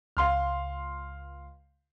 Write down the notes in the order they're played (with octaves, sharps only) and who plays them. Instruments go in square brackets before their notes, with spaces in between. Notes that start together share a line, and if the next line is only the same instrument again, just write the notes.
[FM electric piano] C#2 [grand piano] F5 C6 F6